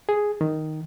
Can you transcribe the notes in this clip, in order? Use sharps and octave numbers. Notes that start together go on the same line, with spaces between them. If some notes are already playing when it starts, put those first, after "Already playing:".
G#4
D#3